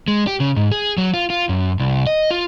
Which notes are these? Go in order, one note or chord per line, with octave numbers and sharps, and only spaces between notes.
G#3
G4
C#3
G#2
G#4
F#3
F4
F4
F#2
C2
D#5
F4